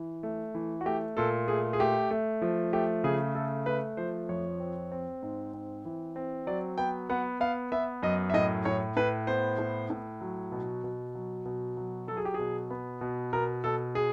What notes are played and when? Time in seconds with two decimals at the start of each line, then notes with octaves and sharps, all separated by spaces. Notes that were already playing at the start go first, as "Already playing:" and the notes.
Already playing: E3
0.23 A3
0.55 E3
0.81 F#4
0.86 A3 G4
1.17 A#2 A4
1.48 A3 G#4
1.73 G#4
1.79 A3 G4
2.11 A3
2.42 F3
2.73 A3 G4
3.04 C#3 G#4
3.35 A3 A4
3.66 A3 B4
3.97 F3 C5
4.29 F2 C#5
4.60 C4
4.92 C4
5.23 G#2
5.53 C4
5.85 E3
6.16 C4
6.47 F#3 D5
6.78 B3 G5
7.09 B3 F#5
7.40 B3 F5
7.72 B3 E5
8.03 F#2 D#5
8.30 E5
8.34 A2 D#5
8.65 A2 C#5
8.97 A2 B4
9.27 B3 C5
9.59 A2
9.90 A2
10.21 F#3
10.52 B2
10.84 B2
11.15 F#3
11.45 B2
11.77 F#3
12.08 F#3 A4
12.17 G#4
12.25 G4
12.34 B2 G#4
12.70 B3
13.01 B2
13.33 B2 A#4
13.64 B2 A4
13.95 G#4